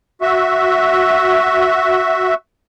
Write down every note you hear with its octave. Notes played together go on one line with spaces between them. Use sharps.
F#4 E5